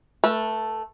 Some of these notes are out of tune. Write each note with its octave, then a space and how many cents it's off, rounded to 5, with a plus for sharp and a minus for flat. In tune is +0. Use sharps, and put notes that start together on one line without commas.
A3 +0 B4 -30